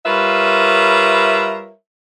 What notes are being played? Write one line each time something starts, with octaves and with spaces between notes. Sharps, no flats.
G3 F4 A#4 B4 C#5 E5